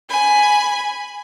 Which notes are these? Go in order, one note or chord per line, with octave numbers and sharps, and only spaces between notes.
G#5 B5